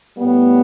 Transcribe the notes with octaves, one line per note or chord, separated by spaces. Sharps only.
A2 G3 B3